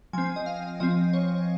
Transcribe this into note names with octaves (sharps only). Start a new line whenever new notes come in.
F3 C4 G#5
D#5
F5
F3 C4 D#5
C#5